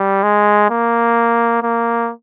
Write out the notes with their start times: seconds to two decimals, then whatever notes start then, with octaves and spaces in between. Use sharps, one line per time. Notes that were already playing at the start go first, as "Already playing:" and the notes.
Already playing: G3
0.23 G#3
0.70 A#3
1.62 A#3